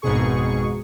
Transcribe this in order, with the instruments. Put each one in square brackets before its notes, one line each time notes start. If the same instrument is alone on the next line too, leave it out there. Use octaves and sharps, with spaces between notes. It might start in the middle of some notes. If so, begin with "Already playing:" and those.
[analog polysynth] G#1 F2 G#2 B2 G#4 C#6